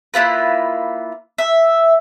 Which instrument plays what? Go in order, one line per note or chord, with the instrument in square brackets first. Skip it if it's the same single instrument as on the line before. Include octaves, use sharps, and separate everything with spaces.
[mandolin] A#3 E4 F4 B4
E5